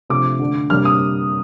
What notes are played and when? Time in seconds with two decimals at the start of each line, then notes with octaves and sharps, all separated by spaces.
0.10 C3 F3 A3 D4 D6
0.40 D3 A3 D4
0.70 C3 G3 A#3 D4 F6
0.85 D#6